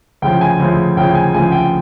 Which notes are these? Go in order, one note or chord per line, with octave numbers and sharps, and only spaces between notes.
D2 C#3 F3 G5
G#5
D2 C#3 F3
D2 C#3 F3 G5
G#5
D2 C#3 F3 G#5
G5